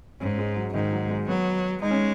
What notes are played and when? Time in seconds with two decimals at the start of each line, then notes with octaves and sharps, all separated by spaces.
0.20 G#2 C#4
0.38 G#3
0.56 F#3
0.74 G#2 D#3
0.92 F#3
1.10 G#3
1.28 F#3 B3
1.82 G#3 D#4
1.91 C#4